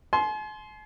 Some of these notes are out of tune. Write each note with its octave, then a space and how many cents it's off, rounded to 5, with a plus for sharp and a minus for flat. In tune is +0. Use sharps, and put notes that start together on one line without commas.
G#5 +45 C6 +0